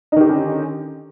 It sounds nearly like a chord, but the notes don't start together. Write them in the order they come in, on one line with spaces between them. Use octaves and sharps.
D#4 D#3 G4 D3 C#4